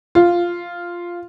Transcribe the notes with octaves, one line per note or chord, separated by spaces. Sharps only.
F4